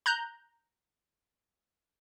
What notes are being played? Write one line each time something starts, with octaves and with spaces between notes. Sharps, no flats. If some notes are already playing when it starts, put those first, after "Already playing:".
A#5 F#6 G6